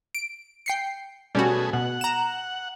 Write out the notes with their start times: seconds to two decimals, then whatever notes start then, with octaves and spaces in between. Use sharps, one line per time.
0.15 D7
0.66 G5 C7 C#7
1.35 B2 G3 A3 C#4 F#4 G#4
1.73 B2 F#5
2.01 A#5 E7